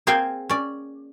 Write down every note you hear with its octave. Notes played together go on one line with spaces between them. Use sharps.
A#3 C4 G#4 F5 G5 G#5
C#4 D5